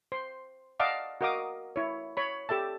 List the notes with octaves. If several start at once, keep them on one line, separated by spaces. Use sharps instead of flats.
C5 C6
D5 D#5 F5 F#5 A5 D6
F#4 A#4 D#5 F5 D6 D#6
E4 C#5
C#5 B5
G4 A4 E5 A5